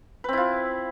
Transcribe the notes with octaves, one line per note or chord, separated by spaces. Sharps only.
C4 E4 F4 B4